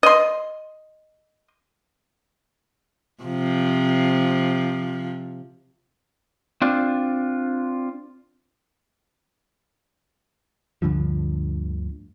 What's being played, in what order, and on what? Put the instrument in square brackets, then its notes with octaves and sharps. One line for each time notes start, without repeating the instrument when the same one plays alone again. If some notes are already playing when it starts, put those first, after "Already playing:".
[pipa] D#5 C6
[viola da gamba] C3 F3
[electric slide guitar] C4 D4 F4
[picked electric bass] D2 G2 D3 F3